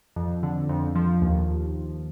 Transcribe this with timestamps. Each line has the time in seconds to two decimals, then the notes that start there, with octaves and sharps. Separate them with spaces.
0.16 F2
0.43 D3
0.69 F2
0.95 F3
1.22 D#2